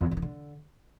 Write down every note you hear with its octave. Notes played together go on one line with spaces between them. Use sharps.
E2
G#2
D3
D#3
D3